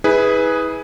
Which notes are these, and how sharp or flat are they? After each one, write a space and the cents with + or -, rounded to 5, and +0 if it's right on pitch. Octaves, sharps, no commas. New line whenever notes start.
E4 -35 G#4 +0 B4 +0